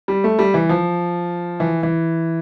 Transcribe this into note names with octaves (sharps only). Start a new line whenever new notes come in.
G3
A3
G3
E3
F3
E3
E3